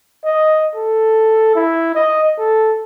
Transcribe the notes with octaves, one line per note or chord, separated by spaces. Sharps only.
D#5
A4
E4
D#5
A4